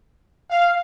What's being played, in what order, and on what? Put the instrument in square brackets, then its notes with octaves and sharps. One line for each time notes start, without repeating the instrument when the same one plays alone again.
[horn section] F5